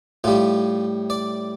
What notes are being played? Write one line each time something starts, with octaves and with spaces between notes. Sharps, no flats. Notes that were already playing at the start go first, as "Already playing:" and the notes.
A2 G3 F4
D5